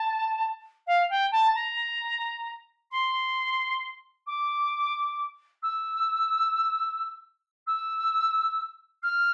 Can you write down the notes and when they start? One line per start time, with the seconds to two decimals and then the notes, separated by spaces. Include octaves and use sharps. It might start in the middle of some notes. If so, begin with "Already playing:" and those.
Already playing: A5
0.86 F5
1.09 G5
1.31 A5
1.55 A#5
2.91 C6
4.26 D6
5.62 E6
7.67 E6
9.02 F6